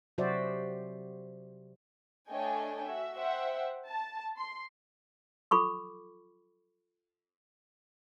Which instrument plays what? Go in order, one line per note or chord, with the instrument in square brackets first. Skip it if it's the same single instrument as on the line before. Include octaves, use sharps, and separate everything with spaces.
[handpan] C3 F#3 F#4 C5 D5 E5
[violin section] A3 D4 C#5 D#5 G5 G#5
F#4 E5
C5 E5 F#5 G5
A5
C6
[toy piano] F4 A4 B5 C#6 D6